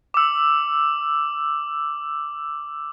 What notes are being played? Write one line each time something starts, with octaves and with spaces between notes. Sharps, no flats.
D6 E6